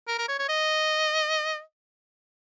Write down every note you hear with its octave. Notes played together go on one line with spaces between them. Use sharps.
A#4
A#4
C#5
C#5
D#5